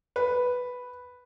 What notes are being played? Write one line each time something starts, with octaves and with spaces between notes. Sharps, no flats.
B4